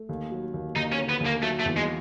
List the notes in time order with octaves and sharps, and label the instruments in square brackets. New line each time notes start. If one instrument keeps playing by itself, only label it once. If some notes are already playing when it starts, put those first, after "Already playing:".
Already playing: [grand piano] A3
D#2
F#3
D#2
[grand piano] D#2 [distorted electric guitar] D#4
[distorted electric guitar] C#4
[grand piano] D3
[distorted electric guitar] B3
[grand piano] D#2
[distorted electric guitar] A#3
[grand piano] F#3 [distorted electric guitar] A3
[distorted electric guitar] A3
[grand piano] E2
[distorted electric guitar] G#3